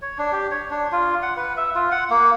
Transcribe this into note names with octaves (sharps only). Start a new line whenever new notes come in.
C#5
D4
G4
C#5
D4
F4
F#5
B4
E5
F4
F#5
A#3